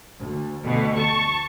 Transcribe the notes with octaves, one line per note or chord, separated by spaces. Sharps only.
D2
D2 B2 D3
A5 C#6